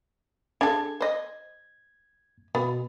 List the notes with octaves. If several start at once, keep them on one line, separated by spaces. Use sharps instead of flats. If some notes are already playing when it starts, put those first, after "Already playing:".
D4 G#4 A4 G#6
C5 D#5
B2 B3